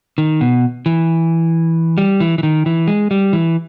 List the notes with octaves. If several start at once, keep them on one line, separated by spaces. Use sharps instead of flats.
D#3
B2
E3
G3
E3
E3
D#3
E3
G#3
G3
E3